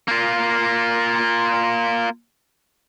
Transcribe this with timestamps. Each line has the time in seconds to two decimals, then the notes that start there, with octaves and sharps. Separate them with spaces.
0.08 A#3 F4